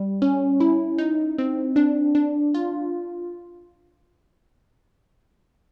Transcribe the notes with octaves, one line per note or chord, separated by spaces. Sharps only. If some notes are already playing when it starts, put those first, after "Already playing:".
Already playing: G3
C#4
E4
D#4
C4
D4
D4
F4